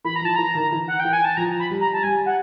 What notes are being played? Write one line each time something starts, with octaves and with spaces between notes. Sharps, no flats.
E3 B5
A#5
F3 A5
E3 A#5
D#3
E3
F#5
E3 G5
G#5
A5
F3 A#5
B5
G3
A#5
A5
G3 G#5
F#5